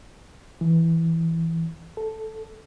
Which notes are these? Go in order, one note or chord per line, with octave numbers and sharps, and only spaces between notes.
E3
A4